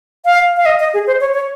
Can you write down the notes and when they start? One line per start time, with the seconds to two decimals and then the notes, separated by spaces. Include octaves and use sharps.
0.25 F5
0.57 F5
0.66 D#5
0.80 D#5
0.94 G#4
1.07 C5
1.21 C#5
1.34 C#5